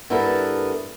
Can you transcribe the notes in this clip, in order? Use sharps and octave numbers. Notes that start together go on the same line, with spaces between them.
G2 B3 E4 A4 A#4